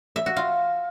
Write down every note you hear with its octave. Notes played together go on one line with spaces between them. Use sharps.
E5
F#4
F4